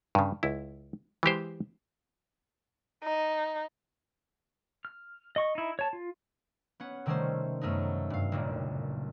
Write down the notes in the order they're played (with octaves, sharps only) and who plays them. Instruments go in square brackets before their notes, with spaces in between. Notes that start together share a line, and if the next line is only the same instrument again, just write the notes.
[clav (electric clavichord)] G2 C#3
C#2 E4
E3 G#3 G4 C5
[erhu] D#4
[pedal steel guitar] F6
D#5 C#6
D#4 E4
C#5 A5
F4
[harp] B3 C#4 F#5
C3 D#3 G3 A3 C#4 C5
F#2 A3 B3 D#4
G2 F5
F#1 B1 A#2